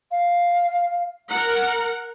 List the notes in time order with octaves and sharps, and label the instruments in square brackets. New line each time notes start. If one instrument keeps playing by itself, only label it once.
[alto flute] F5
[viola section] A#4 F#5 [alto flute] A#5